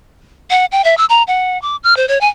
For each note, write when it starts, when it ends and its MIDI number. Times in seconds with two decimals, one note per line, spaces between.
0.50 0.65 78
0.72 0.84 79
0.84 0.95 76
0.97 1.05 88
1.09 1.23 82
1.27 1.60 78
1.62 1.76 86
1.83 1.96 89
1.97 2.06 72
2.08 2.18 73
2.21 2.28 80